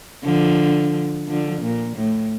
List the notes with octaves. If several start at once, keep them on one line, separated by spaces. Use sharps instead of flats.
D3 F3
D3 F3
A#2
A2